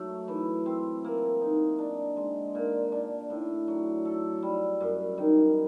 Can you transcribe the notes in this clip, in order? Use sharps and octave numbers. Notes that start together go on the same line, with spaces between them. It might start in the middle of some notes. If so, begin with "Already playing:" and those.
Already playing: F#3 A3
E3
C4
A#3
D#4
D4
G#3
A#2
D4
A2
F#3
A4
G3
F#2
D#3